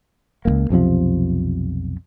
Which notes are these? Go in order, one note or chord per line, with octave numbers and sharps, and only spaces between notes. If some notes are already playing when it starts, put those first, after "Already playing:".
C#2 F#2 A#3
B1 F2 C3 F3